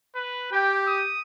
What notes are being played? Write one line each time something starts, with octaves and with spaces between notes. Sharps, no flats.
B4
G4 G5
D#6